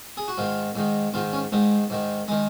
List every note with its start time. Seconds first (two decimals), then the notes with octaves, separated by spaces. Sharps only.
0.17 G#4
0.28 F#4
0.38 G#2 D#3 F4
0.75 G#2 D#3
1.14 G#2 D#3 F4
1.33 C#4
1.52 G#2 D#3 G#3
1.90 G#2 D#3
2.28 D#3 G#3